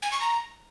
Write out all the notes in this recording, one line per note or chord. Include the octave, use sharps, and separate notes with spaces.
G#5
C#6
A#5